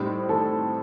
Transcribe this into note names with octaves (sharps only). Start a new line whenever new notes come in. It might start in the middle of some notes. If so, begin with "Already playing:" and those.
Already playing: A2 G3 C4 D#4
A4